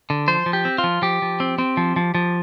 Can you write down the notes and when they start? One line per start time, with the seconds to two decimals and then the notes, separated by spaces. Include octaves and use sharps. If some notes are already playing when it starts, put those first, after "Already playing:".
0.10 D3
0.28 F3 C5
0.46 F3
0.53 G4
0.65 C4
0.78 F4
0.84 F3
1.02 F3 G4
1.22 F3
1.40 C4
1.58 C4
1.77 F3
1.96 F3
2.15 F3